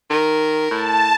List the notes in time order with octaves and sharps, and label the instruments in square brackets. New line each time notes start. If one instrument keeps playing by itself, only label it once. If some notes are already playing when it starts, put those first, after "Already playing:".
[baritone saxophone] D#3 [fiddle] A#4
[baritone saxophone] A2 [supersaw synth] A5